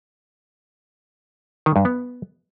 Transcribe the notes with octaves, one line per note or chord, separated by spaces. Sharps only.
D#3
G2
B3